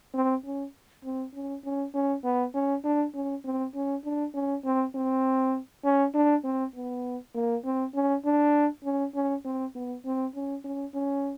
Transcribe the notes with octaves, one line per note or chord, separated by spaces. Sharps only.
C4
C#4
C4
C#4
C#4
C#4
B3
C#4
D4
C#4
C4
C#4
D4
C#4
C4
C4
C#4
D4
C4
B3
A#3
C4
C#4
D4
C#4
C#4
C4
B3
C4
C#4
C#4
C#4